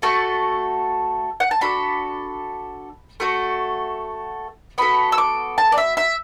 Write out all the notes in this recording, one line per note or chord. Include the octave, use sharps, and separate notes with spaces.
A3 F#4 A4 A5
F#5
A5
D4 F#4 A4 B5
A3 F#4 A4
B3 F#4 A4 B5
E6
D6
A5
D5
E5
E5